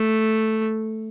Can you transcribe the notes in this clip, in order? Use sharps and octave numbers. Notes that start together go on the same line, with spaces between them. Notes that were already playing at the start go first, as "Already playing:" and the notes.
Already playing: A3